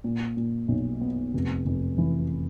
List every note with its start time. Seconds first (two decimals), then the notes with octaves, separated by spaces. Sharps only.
0.04 A#2
0.37 A#2
0.68 B1
1.01 B3
1.34 F1
1.66 F1
1.98 E3